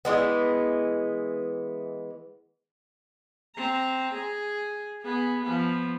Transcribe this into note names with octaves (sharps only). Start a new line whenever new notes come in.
E3 G#3 B3
C4 A#5
G#4
B3 G#4
F3 B3